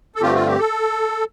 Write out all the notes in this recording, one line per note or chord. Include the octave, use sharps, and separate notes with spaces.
A4
G2 D3 A3 C4 F4 G4
F4
G4
A4